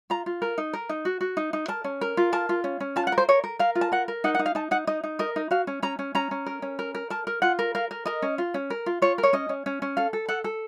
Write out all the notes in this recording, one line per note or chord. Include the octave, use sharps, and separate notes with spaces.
F4 A#5
F4
A#4
D#4
A#4
D#4
F#4
F#4
D#4
D#4
A#4 A5
C#4
A#4
F4
A#4 A5
F4
C#4
C#4
F4 A5
F#5
A#4
C5
A#4 C#5
A#4
A#4 F5
F4
A5
A#4 F#5
A#4
D#4 F#5
F#5
D#4
F5
D#4 A5
D#4 F#5
D#4 D#5
D#4
A#4 D#5
D#4
F#4 F5
C#4
C#4 A#5
C#4
C#4 A#5
C#4
A#4
C#4
A#4
A#4
A#4 A5
A#4
F4 F#5
A#4
A#4 F5
A#4
A#4 D#5
C#4
F4
C#4
A#4
F4
F4 C#5
A#4
C#5
C#4 D#5
C#4
C#4
C#4
A4 F5
A4
A4 F#5
A4